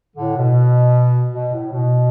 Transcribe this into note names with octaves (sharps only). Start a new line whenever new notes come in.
A2 D3
B2
B2
A2
B2